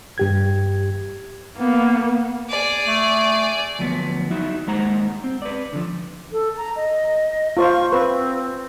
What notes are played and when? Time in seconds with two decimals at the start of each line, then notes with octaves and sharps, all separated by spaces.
0.18 G2 G4 G#6
1.58 A#3 B3
2.49 G#4 D5
2.87 A3
3.79 D2 F3 F#3 B3
4.31 D#4 E4 F#4 E5
4.67 D#2 D#3 G#3 C5 F#5 A#5
5.24 C4
5.42 B4 D5
5.73 D3 F3
6.32 A4
6.57 A#5
6.76 D#5
7.57 F4 C5 F5 C#6
7.92 C4 B4